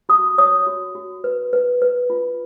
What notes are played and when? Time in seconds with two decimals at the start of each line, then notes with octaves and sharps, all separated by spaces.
0.09 F#4 D#6
0.38 C#5 D#6
0.67 F#4
0.95 F#4
1.24 B4
1.53 B4
1.82 B4
2.10 F4